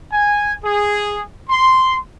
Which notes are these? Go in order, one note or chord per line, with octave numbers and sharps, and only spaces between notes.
G#5
G#4
C6